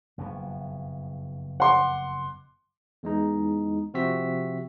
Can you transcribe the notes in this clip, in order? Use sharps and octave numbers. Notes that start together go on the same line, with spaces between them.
F#1 F2 B2
F#5 C6 D6
E2 G#3 D#4
C3 F3 C4 F#4 E5 B6